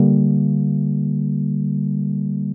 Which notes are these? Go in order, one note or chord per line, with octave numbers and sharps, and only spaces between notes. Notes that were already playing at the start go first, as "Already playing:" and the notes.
Already playing: D3 G3 A#3